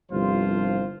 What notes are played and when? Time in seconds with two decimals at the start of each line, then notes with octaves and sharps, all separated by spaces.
0.11 G1 C2 F3 F4 C5